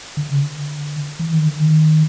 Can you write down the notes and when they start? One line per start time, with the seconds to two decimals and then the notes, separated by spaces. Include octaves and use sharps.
0.17 D3
0.30 C#3
0.42 D3
1.19 E3
1.33 D#3
1.46 D3
1.60 D#3